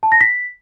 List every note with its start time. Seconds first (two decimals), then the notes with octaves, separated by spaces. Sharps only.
0.03 A5
0.12 A#6
0.21 B6